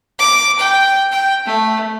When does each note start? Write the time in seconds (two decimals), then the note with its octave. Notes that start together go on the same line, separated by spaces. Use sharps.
0.19 D6
0.59 G5
1.12 G5
1.46 A3